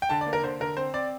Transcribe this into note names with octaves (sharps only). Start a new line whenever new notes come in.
G5
D3 A5
D5
A#3
A#4
D3 C5
D3 A#4
C4 C5
C4 D5